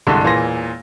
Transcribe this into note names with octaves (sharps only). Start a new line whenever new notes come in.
C2 G2 D3 G#3
E1 A#2 E3 G#4 C6 A#6